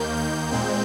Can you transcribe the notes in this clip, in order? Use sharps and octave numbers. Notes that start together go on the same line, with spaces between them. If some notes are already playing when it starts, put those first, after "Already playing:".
Already playing: D#2 D#3 A#3 G6
G6
A#2 G#3 C4